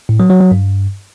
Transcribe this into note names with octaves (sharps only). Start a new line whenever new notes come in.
A2
F#3
F#3
F#3
G2